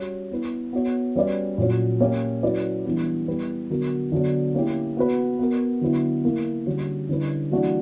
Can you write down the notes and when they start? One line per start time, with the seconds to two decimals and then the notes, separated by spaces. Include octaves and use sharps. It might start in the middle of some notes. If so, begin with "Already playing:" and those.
Already playing: G3 C#4 F#4 C#5
0.31 B3 E4 B4
0.73 B3 F#4 C#5
1.16 G3 C#4 F#4 B4 D5
1.58 A#2 F#3 C#4
2.00 A#3 C#4 G4 C#5
2.43 F#3 C#4 E4 B4 D5
2.85 E3 G3 B3 D4
3.27 G3 B3 E4 G4 B4
3.70 D3 F#3 B3 F#4 A#4
4.12 D3 F#3 B3 D4
4.55 A#3 C#4 E4 G4
4.97 B3 F#4 B4
5.39 B3 F#4 A#4
5.81 D3 F#3 B3 E4 B4
6.24 A#3 E4 A#4
6.66 D3 G3 A#3 C#4 F#4
7.09 D3 G3 C#4 E4 B4
7.51 E3 G3 A#3 D4 F#4